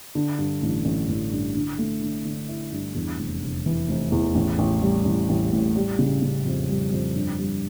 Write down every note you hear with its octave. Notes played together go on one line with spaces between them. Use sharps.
D3
G2
A1
A1
A1
G2
D3
A3
D3
D3
E4
G2
E2
F1
F1
E3
F1
E2
A1
A1
G3
A1
A1
A2
G3
C#3
C#3
F2
G3
F2
G2
G3